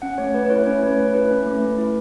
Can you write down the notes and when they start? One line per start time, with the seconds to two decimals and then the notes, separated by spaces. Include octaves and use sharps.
0.02 C#4 F#5
0.18 A3 C#5
0.34 A3 B4
0.45 B4
0.50 E4 C#5
0.66 C#4 C#5
0.83 A3 B4
0.98 A3
1.14 E4 B4
1.31 C#4
1.46 A3
1.62 A3
1.78 E4